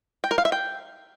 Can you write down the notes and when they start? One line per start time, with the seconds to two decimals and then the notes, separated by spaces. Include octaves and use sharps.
0.24 G5
0.31 A#4
0.38 F5
0.45 E5
0.52 G5